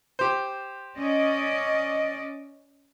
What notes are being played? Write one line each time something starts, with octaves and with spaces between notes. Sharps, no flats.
G4 C5
C#4 D5 D#5